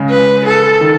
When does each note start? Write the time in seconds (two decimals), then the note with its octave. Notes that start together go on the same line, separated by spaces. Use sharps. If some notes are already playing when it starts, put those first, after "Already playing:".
Already playing: C#3 G#3
0.10 B4
0.45 A4
0.81 D#3